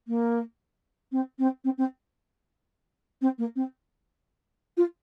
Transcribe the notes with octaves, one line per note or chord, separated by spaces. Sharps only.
A#3
C4
C4
C4
C4
C4
A#3
C4
F4